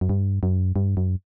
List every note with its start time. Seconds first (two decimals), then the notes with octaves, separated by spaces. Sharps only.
0.01 F#2
0.09 G2
0.43 F#2
0.76 G2
0.97 F#2